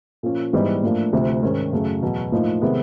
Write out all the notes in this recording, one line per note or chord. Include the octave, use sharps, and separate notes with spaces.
A#2 F3 A#3 C#4
G#2 E3 G3 B3 D#4
A2 F3 A#3 D4
D2 C3 F3
G#2 D#3 G#3 C#4
F#2 C#3 F#3 A3
E2 B2 F#3
A2 F3 A#3 D#4
C3 D#3 G#3 B3